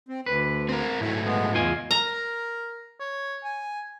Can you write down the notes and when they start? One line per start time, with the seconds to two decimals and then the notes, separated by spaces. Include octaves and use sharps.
0.09 C4
0.26 D2 B4
0.69 C4 A#4
1.00 G#2 F#3 A3 E4
1.25 G#3 B3
1.55 E2 F4 D#5 G#5
1.91 A#4 A#5
3.00 C#5
3.44 G#5